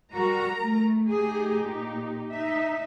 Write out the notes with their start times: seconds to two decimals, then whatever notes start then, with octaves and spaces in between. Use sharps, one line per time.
0.13 G3 F#4 A#4 A#5
0.60 A3
1.08 A3 D#4 G4 G#4
1.61 A#2
2.32 D#4 E5